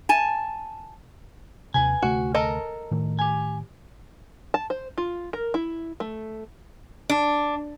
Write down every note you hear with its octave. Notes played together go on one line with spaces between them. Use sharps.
G#5 A5
D#2 C3 B4 G#5
D2 C3 A3 F#4
A4 A#4 D#5
A2 D#3 A3
G4 G#5
A5
C5
F4
A#4
E4
A3
D4